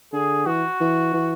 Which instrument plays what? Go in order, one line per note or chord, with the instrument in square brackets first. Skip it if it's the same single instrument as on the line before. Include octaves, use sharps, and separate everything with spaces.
[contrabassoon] D3 [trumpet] G#4
[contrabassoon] E3 [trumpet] F#4
[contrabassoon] E3
E3